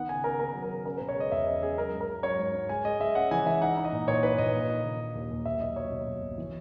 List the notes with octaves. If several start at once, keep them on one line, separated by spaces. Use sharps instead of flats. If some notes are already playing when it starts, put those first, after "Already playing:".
Already playing: D#3 B3 F#5
C#3 G#5
C#3 A#4
B3 A#4
F#3
A#4
C#3
C#4 A#4
B2 B4
C#5
G#3 D#5
E2 E5
C#4 D#5
C#4 G#4
F#3 A#4
G#2
A#4
C#4
F#3 C#5
G#2
G#2
G#3 G#5
G#3 D#5
G#3 E5
C#4 F#5
E3 G#5
E3 E5
D#4 F#5
D#4
D#5
A#2
A#2 C#5
D#4 B4
A#1 D#5
A#3
D#4
D#3
D#4
D#2
D#2
B1 E5
F#3 D#5
F#3 C#5
B2
B1
B1
E3